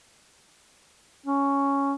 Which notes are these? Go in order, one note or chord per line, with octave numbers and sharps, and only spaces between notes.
C#4